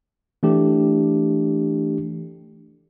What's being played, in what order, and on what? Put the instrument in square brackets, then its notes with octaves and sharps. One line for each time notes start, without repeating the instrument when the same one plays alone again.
[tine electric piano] E3 A3 D4 G4